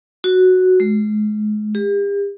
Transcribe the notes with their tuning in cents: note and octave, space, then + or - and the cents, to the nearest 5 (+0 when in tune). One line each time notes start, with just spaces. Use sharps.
F#4 +0
G#3 +35
G4 +40